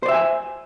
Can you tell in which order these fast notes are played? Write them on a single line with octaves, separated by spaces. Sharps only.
C5 D5 E5 G5 G#5